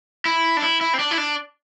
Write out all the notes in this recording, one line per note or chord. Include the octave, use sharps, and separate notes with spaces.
E4
D4
E4
E4
C4
D4
E4
D4